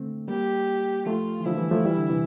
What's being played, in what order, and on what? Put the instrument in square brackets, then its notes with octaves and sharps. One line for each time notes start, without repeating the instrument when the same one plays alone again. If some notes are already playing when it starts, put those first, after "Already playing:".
Already playing: [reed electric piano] D3 A3 C4
[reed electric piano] G3 A#3 [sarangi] G4
[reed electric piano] F3 A3 [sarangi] F4
[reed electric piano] E3
[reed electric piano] D3 F3 [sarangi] E4
[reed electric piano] E3 G3
F3 A3
E3 G3
D3
C3 E3